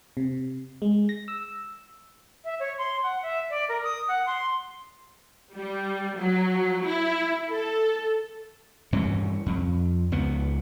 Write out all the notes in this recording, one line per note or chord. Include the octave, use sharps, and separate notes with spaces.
C3
G#3
A#6
E6
E5
C#5
C6
F#5
E5
D5
A#4
D#6
F#5
C6
G3
F#3
E4
A4
G2 E3 C#4
F2
C#2 B3